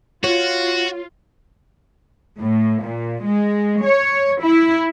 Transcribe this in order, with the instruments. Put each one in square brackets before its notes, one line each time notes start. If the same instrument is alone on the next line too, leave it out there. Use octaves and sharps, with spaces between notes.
[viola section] F4 [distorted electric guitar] F#4 [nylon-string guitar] C#5
[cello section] A2
A#2
G#3
C#5
E4